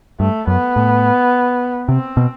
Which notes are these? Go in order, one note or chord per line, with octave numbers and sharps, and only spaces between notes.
G2 A3
F#2 B3
A2
C3 C4
B2